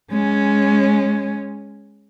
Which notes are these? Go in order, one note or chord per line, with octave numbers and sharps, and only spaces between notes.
G#3 C#4